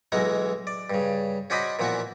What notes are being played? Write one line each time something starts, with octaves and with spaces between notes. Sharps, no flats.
B1 E3 G#3 F#4 A#5
D5
G2 C#3
C#4 F#4 C5 D5 D#5 B5
A#2 E3 F3 B3 F#4